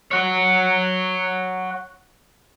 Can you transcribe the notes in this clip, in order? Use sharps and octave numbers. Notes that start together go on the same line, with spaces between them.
C#5 F#5